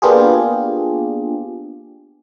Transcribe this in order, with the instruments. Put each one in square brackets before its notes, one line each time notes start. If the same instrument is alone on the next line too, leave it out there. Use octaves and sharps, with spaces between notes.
[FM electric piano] A#3 B3 D4 F4 G4 G#4